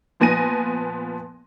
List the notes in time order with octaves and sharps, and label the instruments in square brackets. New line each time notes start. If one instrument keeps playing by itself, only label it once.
[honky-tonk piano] A#2 F3 B3 G#5 A#6 D#7